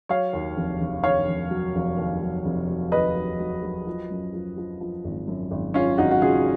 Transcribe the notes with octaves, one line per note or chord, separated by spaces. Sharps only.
F#3 C#5 F5
D#2
F1
F1
D#3 C#5 F5
F1
F#3
F1
D#2
F#3
F1
F#3
D#2 B4 D#5
F#3
F#3
F#3
F3
F#2
F3
F3
F3
G#1
F#2
G#1
F#2 C#4 F4
G#1 D#4 F#4
F#4
C#3 F4 G#4